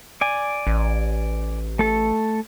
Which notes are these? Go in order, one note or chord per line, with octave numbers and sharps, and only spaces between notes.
D5 G#5
A1
A3 A4